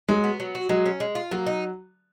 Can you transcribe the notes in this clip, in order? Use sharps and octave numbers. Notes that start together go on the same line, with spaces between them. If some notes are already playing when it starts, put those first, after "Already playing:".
F#3 G#3
B3
F#3
F#4
F#3 G#3
C#4
G#3
F4
F#3 A#3
D#4